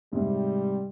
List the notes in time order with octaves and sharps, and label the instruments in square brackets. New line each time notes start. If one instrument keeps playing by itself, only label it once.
[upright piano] G#2 C3 [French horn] G3